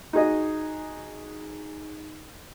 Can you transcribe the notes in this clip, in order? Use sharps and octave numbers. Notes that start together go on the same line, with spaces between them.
D#4 F#4 G#4 D#5